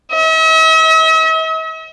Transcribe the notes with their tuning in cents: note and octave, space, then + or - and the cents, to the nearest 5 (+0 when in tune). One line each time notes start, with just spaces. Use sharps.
E5 -45